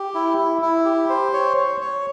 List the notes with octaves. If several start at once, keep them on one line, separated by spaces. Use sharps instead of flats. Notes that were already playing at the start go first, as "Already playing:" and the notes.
Already playing: G4
E4
E4
E4
G4
C5
C#5
C#5
C#5